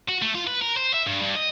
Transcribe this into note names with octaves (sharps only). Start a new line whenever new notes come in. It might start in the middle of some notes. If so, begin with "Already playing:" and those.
F#4
A3
F4
B4
A#4
C5
E5
G2
G2
D#5